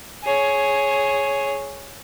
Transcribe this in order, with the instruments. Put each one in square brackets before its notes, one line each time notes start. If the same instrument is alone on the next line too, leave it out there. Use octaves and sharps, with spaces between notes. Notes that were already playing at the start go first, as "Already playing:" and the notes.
[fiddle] G#4 C#5